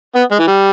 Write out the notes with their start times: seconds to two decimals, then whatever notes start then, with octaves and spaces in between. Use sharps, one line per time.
0.15 B3
0.31 G#3
0.39 E3
0.48 G3